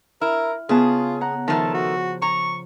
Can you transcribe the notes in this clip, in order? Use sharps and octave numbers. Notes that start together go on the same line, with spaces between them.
E4 A#4 F6
C#3 B3 F4 G#4 A5
F#5 A#5
D#3 F3 A3 A4 A5
F#4
A#5 C#6